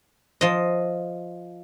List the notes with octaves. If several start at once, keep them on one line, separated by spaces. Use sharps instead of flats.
F3 D#5